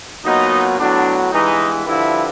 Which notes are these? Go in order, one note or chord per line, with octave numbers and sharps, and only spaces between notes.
A#2 F#3 B3 D#4
A2 F#3 B3 D4
G2 E3 G#3 B3 D#4
G2 D3 F3 E4